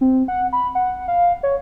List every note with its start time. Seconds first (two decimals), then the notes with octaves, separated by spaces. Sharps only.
0.01 C4
0.28 F#5
0.53 B5
0.75 F#5
1.08 F5
1.43 C#5